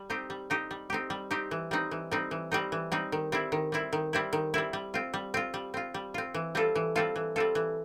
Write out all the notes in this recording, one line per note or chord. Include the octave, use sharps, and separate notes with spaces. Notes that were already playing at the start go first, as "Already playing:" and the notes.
Already playing: G3
C4 D#4 G4
G3
C4 D#4 G4
G3
C4 D#4 G4
G3
C4 D#4 G4
E3
G3 C4 D#4
E3
G3 C4 D#4
E3
G3 C4 D#4
E3
G3 C4 D#4
D#3
G3 C4 E4
D#3
G3 C4 E4
D#3
G3 C4 E4
D#3
G3 C4 E4
G3
C4 F4
G3
C4 F4
G3
C4 F4
G3
C4 F4
E3
G3 C4 F4 A4
E3
G3 C4 F4 A4
E3
G3 C4 F4 A4
E3